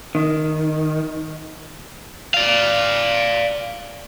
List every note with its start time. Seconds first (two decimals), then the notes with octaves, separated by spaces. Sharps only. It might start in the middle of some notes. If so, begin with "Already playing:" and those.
0.15 D#3
2.34 D5 F5